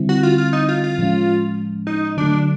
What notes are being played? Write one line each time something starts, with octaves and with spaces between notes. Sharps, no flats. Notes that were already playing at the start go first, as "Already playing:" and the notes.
Already playing: D3 G3 C4 E4
F#4
F4
F4
D#4
F4
F4
A2 F3 G#3 C#4
D#4
D3 F#3 A3 D4